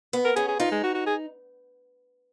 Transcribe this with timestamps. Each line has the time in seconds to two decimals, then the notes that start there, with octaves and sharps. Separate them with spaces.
0.13 B3
0.25 A#4
0.36 C#4 G#4
0.48 G#4
0.59 D#4 F4
0.72 G#3
0.83 F#4
0.94 F#4
1.06 G#4